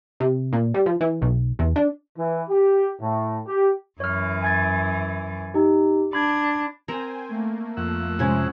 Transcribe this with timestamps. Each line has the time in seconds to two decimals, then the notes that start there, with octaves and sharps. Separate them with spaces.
0.20 C3
0.53 A#2
0.74 G3
0.86 F3
1.01 E3
1.22 B1
1.59 E2
1.76 D4
2.18 E3
2.49 G4
3.01 A2
3.47 G4
4.00 F#2 E3 C#5 F6
4.42 G#5 G#6 A6
5.54 D#4 G4
6.13 D4 B5 G#6
6.88 C4 A#4 C5 G5 G#5 A#5
7.29 A3 A#3
7.77 F2 F#5 E6
8.19 C3 G#3 C#4 E4 G#4 C5